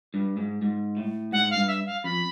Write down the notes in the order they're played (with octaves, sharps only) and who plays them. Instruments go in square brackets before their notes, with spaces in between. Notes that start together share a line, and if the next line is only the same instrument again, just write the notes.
[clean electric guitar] G2
G#2
G#2
A2
[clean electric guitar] G#2 [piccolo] F#5
[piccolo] F5
[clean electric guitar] G2
[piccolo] E5
F5
[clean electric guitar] F2 [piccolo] B5